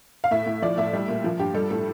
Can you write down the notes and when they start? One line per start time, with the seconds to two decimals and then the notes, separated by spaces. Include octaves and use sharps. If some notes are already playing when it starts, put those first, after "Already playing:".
0.24 F5
0.31 A2 E5
0.46 A2
0.62 F3 D5
0.78 A2 E5
0.93 G3
1.08 A#2
1.24 F3
1.39 G2 G4
1.54 G3 A4
1.70 A2 A4